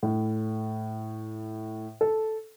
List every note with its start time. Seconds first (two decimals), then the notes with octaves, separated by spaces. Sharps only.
0.03 A2
2.01 A4